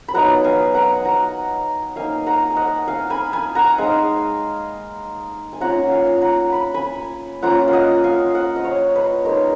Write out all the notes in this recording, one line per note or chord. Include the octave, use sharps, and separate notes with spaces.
B5
F#3 B3 D#4 F#5 A#5
F5 G#5
F#5 A#5
F#5 A#5
A#3 D#4 F5 G#5
F#5 A#5
G#5
D#5 F#5
F5 G#5
G#5 B5
G#5 B5
F#5 A#5
G#3 D#4 F5 G#5
G#5
A#3 C#4 F4 F#5 A#5
F5 G#5
F#5 A#5
B5
G#5 B5
A#3 C#4 F4 F#5 A#5
F5
D#5 F#5
F5 G#5
D#5 F#5
D#5
C#5 F5
B4 D#5
G#3 D#4 A#4 C#5